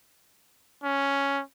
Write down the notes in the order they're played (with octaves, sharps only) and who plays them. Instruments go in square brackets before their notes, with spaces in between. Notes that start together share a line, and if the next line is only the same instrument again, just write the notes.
[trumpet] C#4